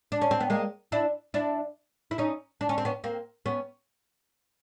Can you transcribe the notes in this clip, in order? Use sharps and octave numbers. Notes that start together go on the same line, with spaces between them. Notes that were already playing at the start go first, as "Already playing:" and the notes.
D4
C#4
C4
B3
G#3 A#3
D4 E4
D4 E4
E4
C#4 D#4
D4
C#4
C4
B3 C#4
A#3 C4
B3 C#4